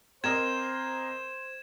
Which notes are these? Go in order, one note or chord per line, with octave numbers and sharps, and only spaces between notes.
C4 A#4 C5 D#5 G#6 E7